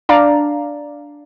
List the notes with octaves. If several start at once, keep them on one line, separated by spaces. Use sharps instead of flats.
D4 D5 F5 A#5